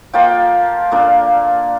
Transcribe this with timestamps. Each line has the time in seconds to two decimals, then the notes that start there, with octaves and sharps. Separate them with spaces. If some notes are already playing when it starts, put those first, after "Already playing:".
0.14 F3 A#3 F4 G5
0.91 A#2 A#3 D4